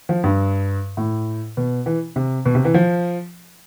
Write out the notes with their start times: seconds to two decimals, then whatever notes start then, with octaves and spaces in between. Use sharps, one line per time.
0.09 F3
0.24 G2
0.97 A2
1.57 B2
1.86 E3
2.16 C3
2.46 B2
2.55 C3
2.65 E3
2.74 F3